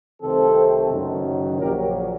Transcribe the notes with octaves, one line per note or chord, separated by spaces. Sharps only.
C2 C3 D#3 A3 C4 A4 C5
F#1 F#2 D#3 F#3
A#1 A#2 F#3 A#3 G4 A#4